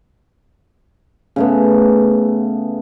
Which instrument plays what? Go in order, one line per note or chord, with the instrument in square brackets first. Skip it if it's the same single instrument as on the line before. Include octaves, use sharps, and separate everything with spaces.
[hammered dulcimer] C#3 A3 B3